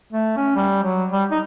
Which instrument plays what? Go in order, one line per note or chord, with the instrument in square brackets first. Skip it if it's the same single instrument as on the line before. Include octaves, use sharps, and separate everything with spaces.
[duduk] A3
C#4
G3
F#3
G3
D#4